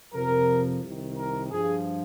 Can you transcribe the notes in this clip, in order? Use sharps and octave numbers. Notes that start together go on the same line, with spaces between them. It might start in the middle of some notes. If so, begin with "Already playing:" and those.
F2 C3 F3 A#4
C2 C3 D#3
A#4
G2 F3 G#4